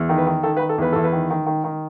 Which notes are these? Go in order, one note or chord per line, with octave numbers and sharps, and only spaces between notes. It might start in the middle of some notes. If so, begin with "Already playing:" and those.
Already playing: E2
D#3
B4
D#3
D#3 A4
B4
D#3
A4
E2 B4
E2 A4
B4
D#3
D#3
D#3
D#3